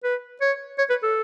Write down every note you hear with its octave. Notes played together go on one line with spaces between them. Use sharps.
B4
C#5
C#5
B4
A4